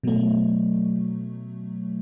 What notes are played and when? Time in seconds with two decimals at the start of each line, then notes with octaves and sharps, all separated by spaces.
0.03 B2 F#3 A3